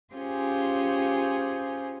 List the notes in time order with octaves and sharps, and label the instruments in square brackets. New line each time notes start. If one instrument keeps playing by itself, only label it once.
[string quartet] C#4 F4 G4 G#4 C5